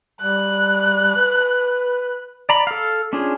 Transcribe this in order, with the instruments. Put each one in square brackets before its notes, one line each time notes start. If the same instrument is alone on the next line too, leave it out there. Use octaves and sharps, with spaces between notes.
[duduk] G3 [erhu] F#6
[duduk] B4
[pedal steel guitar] D5 A#5 B5
A4 F5
C#4 D4 F4 G#4